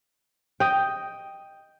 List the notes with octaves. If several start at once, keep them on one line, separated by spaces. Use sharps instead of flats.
D#5 G5